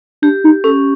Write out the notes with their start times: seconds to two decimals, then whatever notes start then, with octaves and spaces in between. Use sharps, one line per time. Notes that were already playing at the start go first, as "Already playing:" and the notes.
0.22 D4 G4
0.44 D#4
0.64 C#4 A4